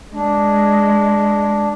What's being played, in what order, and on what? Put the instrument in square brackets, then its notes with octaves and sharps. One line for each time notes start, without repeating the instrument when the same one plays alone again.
[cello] G#3 [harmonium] D4